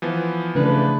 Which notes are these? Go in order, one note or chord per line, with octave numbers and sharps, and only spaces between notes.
E3 F3 B3
C#3 A3 D4 B4